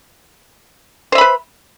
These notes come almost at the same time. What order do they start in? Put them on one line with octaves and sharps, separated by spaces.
C5 E5 B5 B4